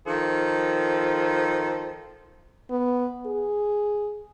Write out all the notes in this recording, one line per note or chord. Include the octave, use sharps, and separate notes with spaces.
D#3 F3 A4
B3
G#4